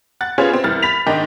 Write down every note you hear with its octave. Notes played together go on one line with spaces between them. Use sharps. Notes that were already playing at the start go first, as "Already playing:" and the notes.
F#5 F#6 A6
B3 C#4 F4 G#4 C5 C#5
B3 C4
C2 E3 F6 A6
B5 A6 B6 F7
G#2 D#3 D4 D#4